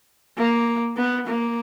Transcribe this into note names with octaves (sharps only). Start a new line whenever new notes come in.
A#3
B3
A#3